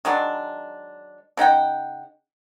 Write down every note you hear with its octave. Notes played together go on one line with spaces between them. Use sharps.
D#3 F#3 G#3 D4
C#3 D#4 F#5 G5